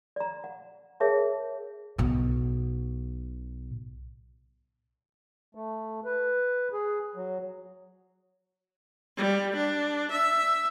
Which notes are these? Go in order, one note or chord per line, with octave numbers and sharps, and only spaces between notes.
D5 A#5
F#5
G#4 A#4 C#5 E5 F#5 A5
B1 B2
A3
B4
G#4
F#3
G3
D4
E5